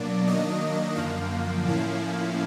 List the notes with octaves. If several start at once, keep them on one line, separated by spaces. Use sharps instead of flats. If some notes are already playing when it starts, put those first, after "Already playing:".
Already playing: B2 F#3 A#3 D4 D5
D#3 F#3 A#3 D4 D#5
F#2 D3 F3 A#3 F5
A2 F3 A#3 C#4 E4